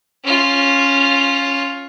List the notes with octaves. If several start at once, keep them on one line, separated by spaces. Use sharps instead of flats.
C#4 F4